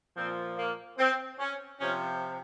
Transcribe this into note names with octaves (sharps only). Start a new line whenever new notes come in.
A#2 F3 C4
A#3
C4
C#4
C3 F3 C#4